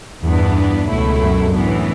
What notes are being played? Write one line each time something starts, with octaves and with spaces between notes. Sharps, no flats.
E2 G2 E3 B3 D4
C#2 B2 F#3 A3 E4
F#2
A2 E3 B3 D4